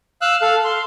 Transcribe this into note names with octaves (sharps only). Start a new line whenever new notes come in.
F5 E6 F#6
A4 F5
C6